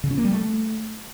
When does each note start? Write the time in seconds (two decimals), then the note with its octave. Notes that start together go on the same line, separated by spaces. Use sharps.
0.04 C#3
0.11 C#4
0.18 A#3
0.25 G3
0.32 A3